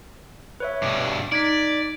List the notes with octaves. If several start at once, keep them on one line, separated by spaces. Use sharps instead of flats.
B4 C#5 E5
G2 B2 D6
D#4 D5 G#6 B6